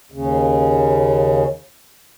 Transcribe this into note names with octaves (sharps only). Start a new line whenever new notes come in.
D#2 C#3